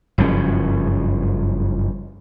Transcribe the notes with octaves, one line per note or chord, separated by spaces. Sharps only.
F#1 G2 F3 C#4